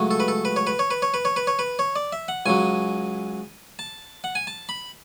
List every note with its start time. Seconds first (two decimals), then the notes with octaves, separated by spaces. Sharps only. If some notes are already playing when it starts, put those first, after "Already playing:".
Already playing: C#2 C#3 F#3 A3
0.11 A4
0.20 B4
0.28 A4
0.45 B4
0.56 C#5
0.67 B4
0.79 C#5
0.90 B4
1.02 C#5
1.14 B4
1.25 C#5
1.36 B4
1.47 C#5
1.59 B4
1.79 C#5
1.96 D5
2.13 E5
2.28 F#5
2.46 C#2 C#3 F#3 G#5
3.79 A5
4.24 F#5
4.35 G#5
4.47 A5
4.69 B5